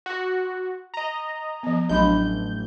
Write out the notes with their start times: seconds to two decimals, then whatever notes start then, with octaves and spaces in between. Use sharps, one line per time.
0.06 F#4
0.94 D#5 A#5
1.63 F3 B3
1.89 A1 F#3 D4 B5 G6